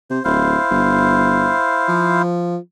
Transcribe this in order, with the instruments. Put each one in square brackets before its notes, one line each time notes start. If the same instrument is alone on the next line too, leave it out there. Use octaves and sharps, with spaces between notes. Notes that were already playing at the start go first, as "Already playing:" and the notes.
[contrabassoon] C3 [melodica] C5
[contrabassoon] D1 [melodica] E4 C5 F5
[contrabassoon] G1
F3